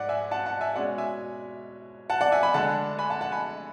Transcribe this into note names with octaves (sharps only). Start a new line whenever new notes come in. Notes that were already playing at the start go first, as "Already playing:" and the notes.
Already playing: G#2 D5 F#5
E5 G#5
F#5 A5
F#5 A5
E5 G#5
B2 G#3 C#4 D5 F#5
E5 G#5
F#5 A5
D5 F#5
E5 G#5
G#5 B5
D3 G#3 D4 F#5 A5
G#5 B5
F#5 A5
F#5 A5
G#5 B5